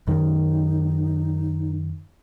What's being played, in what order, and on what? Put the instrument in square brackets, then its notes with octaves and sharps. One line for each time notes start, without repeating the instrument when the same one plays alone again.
[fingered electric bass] F#2 D#3 [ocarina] D#4